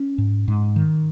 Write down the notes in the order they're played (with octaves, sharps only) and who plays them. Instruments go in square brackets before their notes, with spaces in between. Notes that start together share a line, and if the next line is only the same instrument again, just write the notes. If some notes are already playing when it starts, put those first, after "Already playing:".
Already playing: [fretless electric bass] C#4
G#2
G#2
D#3